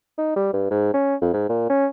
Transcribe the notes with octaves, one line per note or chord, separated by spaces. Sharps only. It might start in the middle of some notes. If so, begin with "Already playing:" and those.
D#4
G3
G2
G#2
C#4
F2
G#2
A#2
C#4